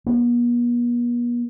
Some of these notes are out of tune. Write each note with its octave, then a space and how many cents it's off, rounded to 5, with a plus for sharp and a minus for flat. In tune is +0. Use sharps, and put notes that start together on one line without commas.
B3 -45